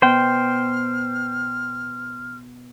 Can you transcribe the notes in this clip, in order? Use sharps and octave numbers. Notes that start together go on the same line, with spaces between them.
B2 C5 G5 F6